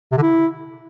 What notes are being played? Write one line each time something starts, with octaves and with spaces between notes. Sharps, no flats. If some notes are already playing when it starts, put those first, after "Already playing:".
C3
D3
E4